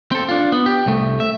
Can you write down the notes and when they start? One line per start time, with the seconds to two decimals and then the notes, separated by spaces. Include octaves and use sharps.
0.12 C4 A4
0.29 D4 F4
0.52 B3
0.66 G4
0.86 C2 A3
1.20 E5